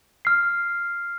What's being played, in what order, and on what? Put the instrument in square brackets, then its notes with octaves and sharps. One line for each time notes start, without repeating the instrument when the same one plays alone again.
[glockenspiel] F6 C7